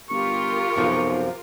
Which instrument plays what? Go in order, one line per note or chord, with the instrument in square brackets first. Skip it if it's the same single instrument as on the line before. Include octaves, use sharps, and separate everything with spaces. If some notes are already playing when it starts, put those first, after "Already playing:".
[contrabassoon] G1 [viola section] F4 G4 A#4 [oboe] C#6
[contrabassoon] B1 [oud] F#2 C3 F3